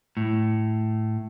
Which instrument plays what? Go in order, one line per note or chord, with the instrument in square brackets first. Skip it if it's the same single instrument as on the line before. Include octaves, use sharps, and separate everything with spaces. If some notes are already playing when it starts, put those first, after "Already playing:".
[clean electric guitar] A2